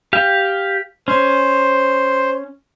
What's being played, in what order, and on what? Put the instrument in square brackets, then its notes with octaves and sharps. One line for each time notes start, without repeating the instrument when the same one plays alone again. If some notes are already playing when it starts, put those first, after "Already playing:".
[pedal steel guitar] G4 F5
[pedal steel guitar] C#4 [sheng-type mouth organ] C5